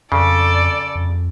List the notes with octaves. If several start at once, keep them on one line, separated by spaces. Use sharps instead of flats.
F2 C#3 A4 D5
F2